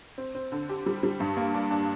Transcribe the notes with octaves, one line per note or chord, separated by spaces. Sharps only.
C4
C4
D3
G4
G3
G3
G2
A#3
D4
D4